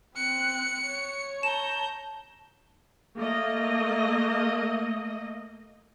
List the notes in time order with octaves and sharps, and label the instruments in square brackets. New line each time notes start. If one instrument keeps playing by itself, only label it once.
[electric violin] C4 F#6 [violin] C#7
[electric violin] C#5
[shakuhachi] A5 [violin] A#5 G6 [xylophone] E7
[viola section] A3 A#3 D#5